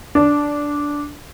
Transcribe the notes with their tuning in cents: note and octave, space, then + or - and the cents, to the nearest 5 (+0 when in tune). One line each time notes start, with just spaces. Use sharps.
D4 -10